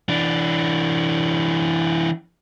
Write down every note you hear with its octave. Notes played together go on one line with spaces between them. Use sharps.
E3 D4